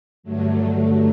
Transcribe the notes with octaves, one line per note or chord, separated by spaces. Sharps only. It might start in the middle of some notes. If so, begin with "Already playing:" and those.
G2 D3 F#3 A3